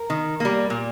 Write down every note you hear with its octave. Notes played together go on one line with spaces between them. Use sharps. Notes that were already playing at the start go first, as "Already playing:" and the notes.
Already playing: A#4
D#3
G3 A#3
A#2